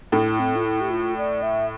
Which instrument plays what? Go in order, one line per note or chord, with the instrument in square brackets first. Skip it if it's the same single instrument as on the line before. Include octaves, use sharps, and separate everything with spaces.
[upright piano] A2 [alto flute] E4
[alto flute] C4
F4
E4
G4
F4
D5
E5